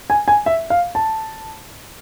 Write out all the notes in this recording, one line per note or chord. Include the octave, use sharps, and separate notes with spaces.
G#5
G#5
E5
F5
A5